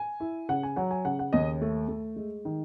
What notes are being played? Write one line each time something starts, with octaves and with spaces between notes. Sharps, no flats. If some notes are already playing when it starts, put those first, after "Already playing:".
Already playing: G#5
E4
C#3 F#5
G#5
F#3 F#5
G#5
C#3 F#5
F#5
D#2 D#5
A3
A3
G#3
D#3